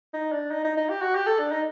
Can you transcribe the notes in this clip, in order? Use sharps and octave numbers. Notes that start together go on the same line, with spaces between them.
D#4
D4
D#4
D#4
D#4
G4
F#4
G4
A4
D4
D#4